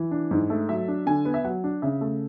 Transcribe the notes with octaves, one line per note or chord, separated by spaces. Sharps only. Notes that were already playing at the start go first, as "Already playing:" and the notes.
Already playing: E3
D4
G#2
A3
F#3 E5
D4
D3 G#5
B3
E5
F#3 F#5
D4
C#3 E5
A3